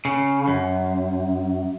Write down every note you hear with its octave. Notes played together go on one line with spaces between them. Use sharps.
C#3
F#2